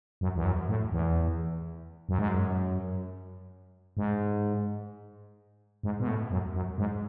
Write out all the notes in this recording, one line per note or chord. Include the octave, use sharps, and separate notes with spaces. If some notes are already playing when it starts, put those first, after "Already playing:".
F#2
E2
F#2
A2
E2
F#2
G#2
F#2
G#2
G#2
B2
A2
F#2
F#2
G#2